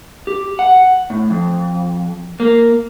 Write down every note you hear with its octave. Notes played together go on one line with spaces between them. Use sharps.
G4
F#5
A2
F2
A#3